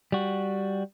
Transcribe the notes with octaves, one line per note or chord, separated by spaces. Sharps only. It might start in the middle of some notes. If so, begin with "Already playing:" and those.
G3 F#4